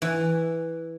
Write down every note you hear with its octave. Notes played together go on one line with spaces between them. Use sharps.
E3